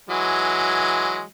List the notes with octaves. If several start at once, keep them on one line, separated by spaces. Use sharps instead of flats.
E3 F#3 G#3